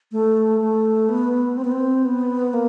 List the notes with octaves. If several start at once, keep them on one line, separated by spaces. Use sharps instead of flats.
A3
A3
B3
C4
B3
C4
B3
A#3